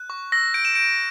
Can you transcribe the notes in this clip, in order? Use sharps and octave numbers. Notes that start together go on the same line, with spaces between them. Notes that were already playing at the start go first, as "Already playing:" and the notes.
Already playing: F#6
C#6
E6 A#6
G6 D7
E7
G6 D7